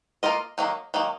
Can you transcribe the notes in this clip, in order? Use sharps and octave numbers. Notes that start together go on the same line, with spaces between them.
A#3 F4 A#4 D#5
D#3 F#3 A#3
D#3 F#3 A#3